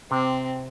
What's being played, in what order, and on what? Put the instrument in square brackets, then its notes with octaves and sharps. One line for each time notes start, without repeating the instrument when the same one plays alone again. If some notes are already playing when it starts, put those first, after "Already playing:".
[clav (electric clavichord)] C3 [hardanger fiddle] C4